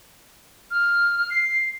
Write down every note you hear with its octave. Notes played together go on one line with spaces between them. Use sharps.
F6
C7